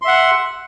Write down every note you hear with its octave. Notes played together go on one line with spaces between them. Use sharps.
E5 F#5 C6